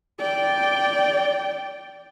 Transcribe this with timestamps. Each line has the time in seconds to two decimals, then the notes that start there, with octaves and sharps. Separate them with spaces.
0.20 D5 G5